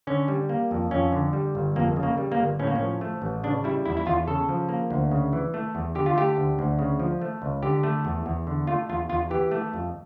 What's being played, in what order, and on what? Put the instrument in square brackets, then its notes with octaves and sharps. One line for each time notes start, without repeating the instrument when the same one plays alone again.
[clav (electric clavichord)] D3 C#4
G3
A#3
F2
F2 C#4
D3
G3
G1
F2 A#3
C#3
A#3
G3
A#3
G1
A2 C#4
A#3
C#4
F3
A3
A1
C#3 D4
G3 E4
E2 E4
E4
E2 F4
C#3 A4
F3
A#3
D2
C#3
E3
A3
E2
D3 G4
F4
A3 G4
D2
D2
C#3
F3
A3
C#2
D3 G4
A3
E2
E2
D3
A3 F4
E2 F4
E2 F4
E3 G4
A3
F2